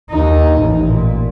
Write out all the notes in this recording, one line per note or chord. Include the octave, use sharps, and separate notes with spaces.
D#2 D#4
A1 A2
A#2